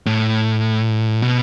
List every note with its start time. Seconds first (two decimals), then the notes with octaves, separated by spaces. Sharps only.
0.06 A2
1.22 B2